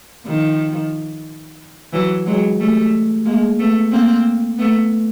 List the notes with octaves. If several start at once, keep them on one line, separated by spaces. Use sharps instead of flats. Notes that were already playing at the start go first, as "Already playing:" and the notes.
D#3 F3
E3 F#3
F#3 G#3
G3 A3
G#3 A#3
A3 B3
A#3 C4
A3 B3